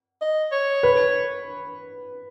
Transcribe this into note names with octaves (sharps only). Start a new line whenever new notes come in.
D#5
C#5
B4